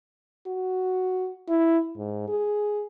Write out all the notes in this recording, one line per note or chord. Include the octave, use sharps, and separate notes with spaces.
F#4
E4
G#2
G#4